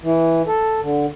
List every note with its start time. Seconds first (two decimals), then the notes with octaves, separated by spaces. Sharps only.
0.03 E3
0.47 A4
0.81 D3